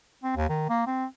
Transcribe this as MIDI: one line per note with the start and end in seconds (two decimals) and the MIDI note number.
0.23 0.35 60
0.36 0.48 39
0.49 0.67 51
0.69 0.84 58
0.86 1.05 60